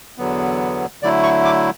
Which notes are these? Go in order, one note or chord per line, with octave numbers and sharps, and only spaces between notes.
E2 D3 F#3 B3
D3 F#3 A3 E4 D5
C#6
D6